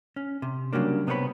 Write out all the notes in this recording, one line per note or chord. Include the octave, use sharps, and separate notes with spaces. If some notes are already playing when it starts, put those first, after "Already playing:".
C#4
C3
C#3 F#3 G3 A#3 D4
C3 B3 C4 F4 C#5 B5